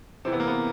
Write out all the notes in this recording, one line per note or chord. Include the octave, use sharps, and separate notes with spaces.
C3 E3 C4
B3
A#3
B3